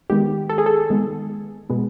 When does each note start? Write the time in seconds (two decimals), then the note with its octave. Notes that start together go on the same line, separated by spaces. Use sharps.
0.10 D#3 G#3 B3 G4
0.50 A4
0.58 G#4
0.66 A4
0.90 D#3 G#3 B3
1.70 B2 G#3 B3